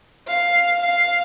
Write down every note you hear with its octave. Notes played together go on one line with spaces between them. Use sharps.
F5
F5